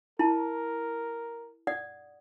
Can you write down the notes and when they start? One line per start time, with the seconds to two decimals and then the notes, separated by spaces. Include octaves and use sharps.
0.19 E4 A#4 A5
1.67 D5 F#5 D#6